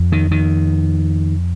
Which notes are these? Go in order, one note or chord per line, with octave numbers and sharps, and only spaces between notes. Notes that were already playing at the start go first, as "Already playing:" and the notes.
Already playing: F2
D#3
D#3